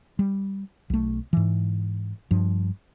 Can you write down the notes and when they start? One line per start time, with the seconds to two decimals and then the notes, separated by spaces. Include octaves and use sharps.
0.19 G3
0.90 B1 A3
1.33 G#2 E3
2.31 G2 F3